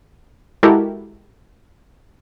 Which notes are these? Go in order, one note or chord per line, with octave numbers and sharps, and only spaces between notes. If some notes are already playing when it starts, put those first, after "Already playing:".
G#3 E4 F#4 G4 A4 A#4